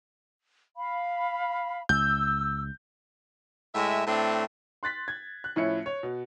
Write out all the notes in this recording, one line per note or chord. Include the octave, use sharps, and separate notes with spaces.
F5 B5
C#2 E6 G6
A2 G#3 E5
A2 A3 C4 D4
C6 F#6 A6 B6
G#6
F#6
A2 F3 C#4 E4 E5 C#7
C#5
B2